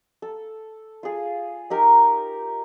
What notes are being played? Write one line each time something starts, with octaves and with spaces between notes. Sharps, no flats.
A4
F4 G#4
D#4 G4 A#4